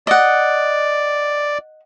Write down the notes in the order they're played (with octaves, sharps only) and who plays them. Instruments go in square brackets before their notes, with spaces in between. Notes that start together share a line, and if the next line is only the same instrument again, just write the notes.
[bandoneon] D5 [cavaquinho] D#5 F#5